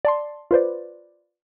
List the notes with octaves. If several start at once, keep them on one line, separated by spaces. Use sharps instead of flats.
D5 A5 C6
F4 B4 C5 D5